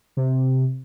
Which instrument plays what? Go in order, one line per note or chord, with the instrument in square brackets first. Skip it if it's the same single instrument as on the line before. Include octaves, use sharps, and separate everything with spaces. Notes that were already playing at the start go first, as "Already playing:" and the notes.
[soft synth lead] C3